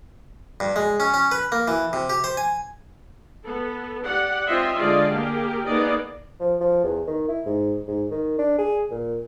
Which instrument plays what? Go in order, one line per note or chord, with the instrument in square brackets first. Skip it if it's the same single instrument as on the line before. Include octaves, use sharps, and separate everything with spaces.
[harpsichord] G2
G#3
C#4
C#4
B4
A#3
E3
C3
G4
C5
G#5
[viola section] B3 A4
G4 D5 F#5
C4 F4 D#5 E5 C6
D3 G#3 F4 D5 D#5 F5
A#3 G4 G#4 A#4
A#3 B3 D#4 G#4 D5 D#5
[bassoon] F3
F3
E2
D#3
E4
G#2
G#2
D#3
D4
G#4
A#2